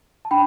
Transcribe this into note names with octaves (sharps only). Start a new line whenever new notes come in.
A5
D4 G5 B5